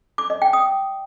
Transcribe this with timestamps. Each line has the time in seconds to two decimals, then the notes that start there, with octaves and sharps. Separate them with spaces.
0.18 D6
0.30 D#5
0.42 G5
0.53 D#6